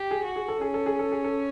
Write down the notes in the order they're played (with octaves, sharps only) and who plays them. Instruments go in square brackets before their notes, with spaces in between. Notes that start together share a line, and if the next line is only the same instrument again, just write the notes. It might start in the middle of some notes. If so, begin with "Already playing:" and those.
Already playing: [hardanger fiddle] G4
[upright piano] G#4
[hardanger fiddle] F#4
[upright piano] G#4
A4
[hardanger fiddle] C#4 [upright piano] G#4
[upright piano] A4
G#4
A4
G#4
A4